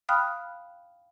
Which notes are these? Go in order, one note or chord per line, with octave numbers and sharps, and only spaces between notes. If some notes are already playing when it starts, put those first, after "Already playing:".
F5 G5 B5 D#6 F6 F#6